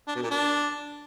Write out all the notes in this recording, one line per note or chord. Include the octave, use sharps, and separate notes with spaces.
D4
B2
A#2
D4